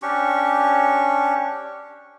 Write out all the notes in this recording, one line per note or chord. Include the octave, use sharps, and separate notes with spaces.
C#4 D4 G4 C#6